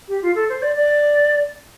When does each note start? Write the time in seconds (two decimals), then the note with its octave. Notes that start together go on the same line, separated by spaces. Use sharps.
0.08 G4
0.22 F4
0.35 A4
0.49 C5
0.62 D5
0.75 D5